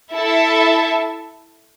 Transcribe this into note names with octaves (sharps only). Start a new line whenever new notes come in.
E4 A4 E5 A5